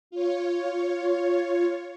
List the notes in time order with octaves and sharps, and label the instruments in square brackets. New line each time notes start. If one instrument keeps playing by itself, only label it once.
[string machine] F4 C#5